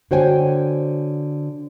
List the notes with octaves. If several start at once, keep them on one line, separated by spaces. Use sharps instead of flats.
D3 F#4 C5 C#5 G5 G#5